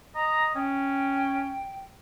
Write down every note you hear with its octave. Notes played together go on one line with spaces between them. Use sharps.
D#5 A#5
C#4 G5